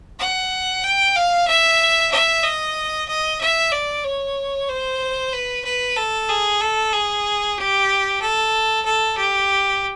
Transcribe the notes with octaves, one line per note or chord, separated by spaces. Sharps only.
F#5
G5
F5
E5
E5
D#5
D#5
E5
D5
C#5
C5
B4
B4
A4
G#4
A4
G#4
G4
A4
A4
G4